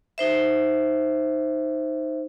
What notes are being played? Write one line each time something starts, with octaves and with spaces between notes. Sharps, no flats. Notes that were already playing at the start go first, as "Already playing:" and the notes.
D#4 C5 E5